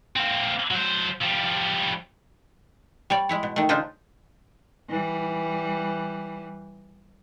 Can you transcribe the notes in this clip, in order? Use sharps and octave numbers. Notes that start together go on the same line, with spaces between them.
A#3 C4
F#3 C5
F3 G3
G3 C#5 D5
G#3 E4 C#5
B2
D#3 A3
C#3 D4 D#4 F4 C5
E3 G3